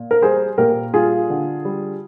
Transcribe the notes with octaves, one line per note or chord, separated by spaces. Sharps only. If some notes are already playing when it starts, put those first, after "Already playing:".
Already playing: A#2
A#4
G3 G#4 C5
A#2 G4 A#4
G3 F4 G#4
D3
G3